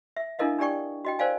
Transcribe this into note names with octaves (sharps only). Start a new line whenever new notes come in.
E5
D4 E4 A4 A#4 D#5 F5
D4 G4 A4 D5 G5 C#6
F#4 D#5 G5
A#4 C5 D5 F5 G#5